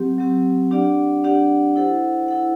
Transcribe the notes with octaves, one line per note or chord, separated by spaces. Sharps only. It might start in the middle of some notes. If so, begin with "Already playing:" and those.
Already playing: F#3 C4 G4
F#3 C4 G4
D4 G4 D5 F#5
D4 G4 D5 F#5
E4 A4 C5 F#5
E4 A4 C5 F#5